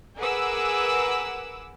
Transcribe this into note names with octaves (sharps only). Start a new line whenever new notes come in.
G#4 A#4 B4 F#5 D6 E6